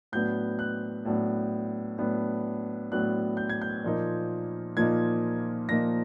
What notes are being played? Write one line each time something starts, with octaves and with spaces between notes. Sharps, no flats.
A2 F#3 B3 D4 G6
F#6
A2 F#3 B3 D4
A2 F#3 B3 D4
A2 F#3 B3 D4 F#6
G6
G#6
G6
A#2 F3 A#3 D#4
A#2 F3 A#3 D#4 G#6
A#2 F3 A#3 D#4 A#6